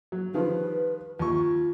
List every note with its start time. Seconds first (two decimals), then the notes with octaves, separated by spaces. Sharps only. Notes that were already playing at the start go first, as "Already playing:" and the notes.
0.12 F#3
0.34 D#3 F3 G3 B4
1.19 D#2 F4 C#6